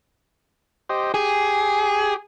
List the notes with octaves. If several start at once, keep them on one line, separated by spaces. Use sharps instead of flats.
G4 C5 D#5
G4 G#4